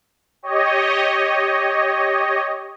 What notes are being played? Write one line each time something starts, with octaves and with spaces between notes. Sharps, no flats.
G4 C#5 D#5